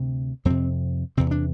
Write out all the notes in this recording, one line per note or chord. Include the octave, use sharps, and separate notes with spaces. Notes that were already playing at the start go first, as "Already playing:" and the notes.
Already playing: D2 C3
F2 C3 C4
E2 C3 C4
D4